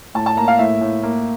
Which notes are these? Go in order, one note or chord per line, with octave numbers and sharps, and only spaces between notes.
A2 A5
A5
A#3 A#5
F5
A2 E5
A2
A#3